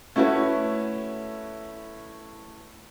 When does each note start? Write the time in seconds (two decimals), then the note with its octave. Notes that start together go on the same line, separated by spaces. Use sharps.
0.16 A3 C#4 E4 F#4 B4